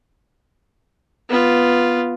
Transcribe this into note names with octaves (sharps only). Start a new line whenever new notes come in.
B3 F4